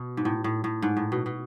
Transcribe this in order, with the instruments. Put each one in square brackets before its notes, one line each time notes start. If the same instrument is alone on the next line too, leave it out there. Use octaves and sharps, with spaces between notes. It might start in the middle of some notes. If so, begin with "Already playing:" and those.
Already playing: [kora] B2
G#2
A2
A2
A2
G#2
A2
B2
B2